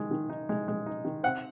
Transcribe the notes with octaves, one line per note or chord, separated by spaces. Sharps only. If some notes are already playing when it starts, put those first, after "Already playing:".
Already playing: D#3 G#3
D#3
D#4
G#3
G#3
D#4
D#3
C4 F#5